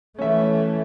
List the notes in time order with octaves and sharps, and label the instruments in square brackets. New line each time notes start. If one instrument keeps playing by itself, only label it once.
[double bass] E3 A3 [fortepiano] C#4 E5